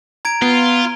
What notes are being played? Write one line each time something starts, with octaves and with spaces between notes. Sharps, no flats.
A#5 G#6 D7
B3 F4